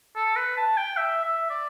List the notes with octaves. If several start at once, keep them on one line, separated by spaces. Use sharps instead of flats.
A4
B4
A5
G5
E5
E5
D5